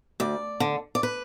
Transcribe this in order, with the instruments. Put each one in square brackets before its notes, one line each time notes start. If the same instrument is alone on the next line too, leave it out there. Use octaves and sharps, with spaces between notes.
[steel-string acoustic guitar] D2 D5
D3
D5
B4